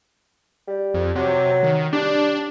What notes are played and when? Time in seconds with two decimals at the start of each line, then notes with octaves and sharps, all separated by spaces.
0.68 G3
0.94 F2
1.15 C3 F#3
1.63 D#3
1.93 G3 D4